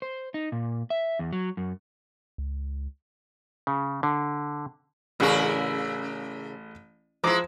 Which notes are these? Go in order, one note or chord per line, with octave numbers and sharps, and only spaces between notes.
C5
D#4
A#2
E5
E2
F#3
F#2
C#2
C#3
D3
A1 C#3 E4 G#4 A#4 C#6
F3 G#3 E4 A#5 D6